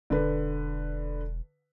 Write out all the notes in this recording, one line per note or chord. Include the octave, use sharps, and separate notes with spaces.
E1 D3 B4